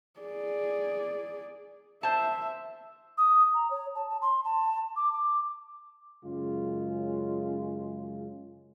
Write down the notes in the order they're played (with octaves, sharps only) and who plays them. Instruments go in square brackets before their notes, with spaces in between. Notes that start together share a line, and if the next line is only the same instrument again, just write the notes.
[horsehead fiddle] G#4 D5
[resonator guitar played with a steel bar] C5 A5 [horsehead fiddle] E5
[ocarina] D#6
A#5
C#5
A5
A5
C6
A5
D6
D6
[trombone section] F#2 C#3 G#3 C#4 F4